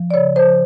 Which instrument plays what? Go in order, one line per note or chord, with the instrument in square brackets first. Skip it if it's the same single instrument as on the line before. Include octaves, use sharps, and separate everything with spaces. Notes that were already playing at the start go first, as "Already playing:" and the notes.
Already playing: [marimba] F3
D5
C#3 C#5
F3 C5